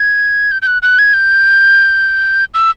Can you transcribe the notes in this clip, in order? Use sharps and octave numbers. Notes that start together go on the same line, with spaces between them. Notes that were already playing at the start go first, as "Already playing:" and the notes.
Already playing: G#6
G6
G6
F#6
F#6
G#6
G6
E6